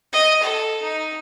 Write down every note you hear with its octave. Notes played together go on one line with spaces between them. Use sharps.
D#5
A4
D#4